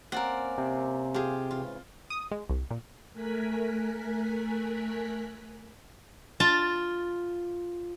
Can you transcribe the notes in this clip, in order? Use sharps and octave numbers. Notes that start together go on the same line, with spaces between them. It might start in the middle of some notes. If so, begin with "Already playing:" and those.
A#3 C4 C#4 A#4 D5 F#5
C3
F4 G4 G#4
G#2 C#3 E3 F4
D#6
G#3
C2
A#2
A3 A#4 G#5 F#6 B6
F4 A5